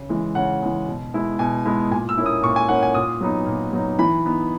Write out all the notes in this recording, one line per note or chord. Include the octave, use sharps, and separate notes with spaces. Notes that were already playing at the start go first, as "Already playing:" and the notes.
Already playing: C#3
E3 G#3
C#3 F#5
E3 G#3
B2
G#3 B3 E4
B2 G#5
G#3 B3 E4
A#2 G#5
E6
A#3 C#4 E4
D#6
A#2 C#6
G#5
A#3 C#4 E4 F#5
G#5
A#2 D#6
F#3 B3 D#4
A#2
F#3 B3 D#4
E3 B5
B3 D#4